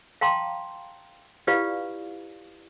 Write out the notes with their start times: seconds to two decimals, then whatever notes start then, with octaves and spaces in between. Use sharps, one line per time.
0.21 F5 G5 A5 A#5 C6 D6
1.47 E4 F4 G4 B4 D5 F5